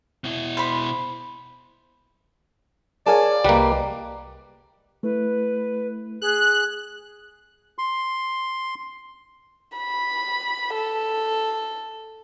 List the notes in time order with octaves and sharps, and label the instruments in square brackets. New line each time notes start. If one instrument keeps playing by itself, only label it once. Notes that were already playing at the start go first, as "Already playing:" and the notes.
[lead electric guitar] B2 E4
[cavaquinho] C5 B5
[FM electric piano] G#4 A#4 F5 [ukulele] C#5 G#5 A5 [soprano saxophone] D5
[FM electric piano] C2 [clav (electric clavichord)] G3 A#3 [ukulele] G4 B4 D#5
[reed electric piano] A3 E4 [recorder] B4
[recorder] G#4 [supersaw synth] F#6
[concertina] C6
[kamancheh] B5
A4